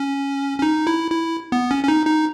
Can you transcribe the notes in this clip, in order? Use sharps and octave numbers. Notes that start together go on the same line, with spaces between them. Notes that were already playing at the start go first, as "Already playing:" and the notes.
Already playing: C#4
C#4
D#4
E4
E4
B3
C#4
C#4
D#4
D#4